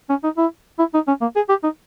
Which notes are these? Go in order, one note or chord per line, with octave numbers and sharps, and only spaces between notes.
C#4
D#4
E4
E4
D#4
C#4
A#3
G#4
G4
D#4